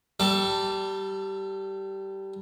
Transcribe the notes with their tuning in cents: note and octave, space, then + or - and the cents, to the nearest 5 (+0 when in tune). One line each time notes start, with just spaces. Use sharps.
G3 -15 A4 +15 D6 -15